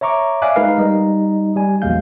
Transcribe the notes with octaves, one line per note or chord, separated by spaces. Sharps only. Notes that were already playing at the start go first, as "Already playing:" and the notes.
C#5 E5 A#5 C#6 D6
D5 E5 F5 G#5 D6 F#6
G#3 D#4 A#4 B4 F5
G3 D#4 D#5
G3 G#5
A#1 E2 F#3 G#3 F5 G6